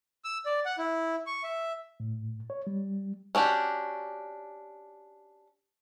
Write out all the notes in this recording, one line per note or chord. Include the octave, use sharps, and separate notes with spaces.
E6
D5
F#5
E4
C#6
E5
A2
C#5
G3
C#4 D4 F#4 G4